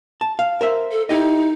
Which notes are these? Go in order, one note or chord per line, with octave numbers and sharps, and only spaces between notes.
A5
F5
A#4 C5 E5
A4
D#4 E4 G4 D#5